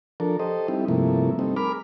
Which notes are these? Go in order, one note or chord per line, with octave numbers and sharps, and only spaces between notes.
F3 D4 A4 A#4
G4 A4 C5 D#5
G3 C4 D#4 E4 G4
G2 C3 F3 A3 A#3 E4
G3 A3 C4 D#4
G#4 A#4 B5 D6 F6